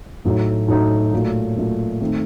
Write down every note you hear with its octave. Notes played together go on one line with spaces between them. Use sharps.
A2 F#3 A3 D#4
A2 F#3 A3 D#4
A#2 F#3 A3
A#2 F#3 A3
D#3 A3 C4 D#4